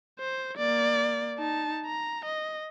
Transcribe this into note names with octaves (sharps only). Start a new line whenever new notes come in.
C5
A#3 D5
D#4 A5
A#5
D#5